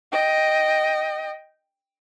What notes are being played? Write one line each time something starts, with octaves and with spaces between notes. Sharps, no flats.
D#5 G5